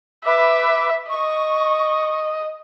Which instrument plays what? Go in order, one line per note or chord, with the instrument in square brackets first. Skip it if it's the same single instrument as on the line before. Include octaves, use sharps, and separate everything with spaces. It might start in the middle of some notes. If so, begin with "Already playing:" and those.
[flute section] B4 D6 [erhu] E5
[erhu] D#5 [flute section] C#6